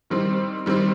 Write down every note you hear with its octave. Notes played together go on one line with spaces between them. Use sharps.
D#3 G3 C4
D#3 G3 C4